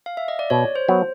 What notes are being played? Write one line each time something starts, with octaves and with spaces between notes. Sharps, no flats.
F5
E5
D#5
D5
B2 C#5
C5
F#3 B3